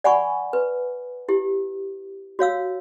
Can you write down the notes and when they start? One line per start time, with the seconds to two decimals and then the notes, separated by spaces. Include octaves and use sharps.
0.04 D5 F#5 G#5 B5 C#6
0.53 B4
1.29 E4 G4
2.39 F#4 C#5 F5 E6